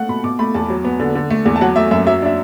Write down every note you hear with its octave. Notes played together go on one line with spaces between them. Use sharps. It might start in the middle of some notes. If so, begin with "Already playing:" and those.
Already playing: A3 F#5
B2 B5
B2 D6
A3 B5
E2 A5
F#3
B3
D3
D3
A3
E2
A5
F#3 F#5
A3 E5
F#2 E5
F#3 E5
D4 E5